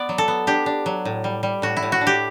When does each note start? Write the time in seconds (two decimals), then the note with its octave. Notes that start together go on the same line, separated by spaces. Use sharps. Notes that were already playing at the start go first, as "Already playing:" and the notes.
Already playing: B3 D5
0.09 F#3
0.18 A4
0.28 B3
0.47 D4 G4
0.66 D4
0.86 F#3
1.05 A2
1.24 G3
1.43 G3
1.62 A2 F#4
1.77 E4
1.83 A2
1.92 F#4
2.01 D4
2.07 G4